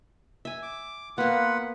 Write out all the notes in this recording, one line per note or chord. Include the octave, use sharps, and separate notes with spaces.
E5 G#5
D6
A#3 B3 F4 B4 F#5